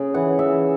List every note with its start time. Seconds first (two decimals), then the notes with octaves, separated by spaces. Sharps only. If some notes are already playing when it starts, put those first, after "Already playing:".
Already playing: C#3
0.14 E3 F#5
0.39 C#3 E5